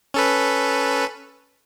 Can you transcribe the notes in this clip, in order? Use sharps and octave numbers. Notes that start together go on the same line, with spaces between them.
C#4 A4 B4